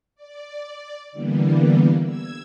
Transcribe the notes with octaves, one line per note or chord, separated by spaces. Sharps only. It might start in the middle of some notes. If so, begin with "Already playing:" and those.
D5
D3 E3 G3 A#3 B3
E6 G#6